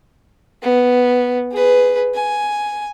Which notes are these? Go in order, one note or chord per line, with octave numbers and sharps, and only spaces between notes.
B3
G#4 B4
G#5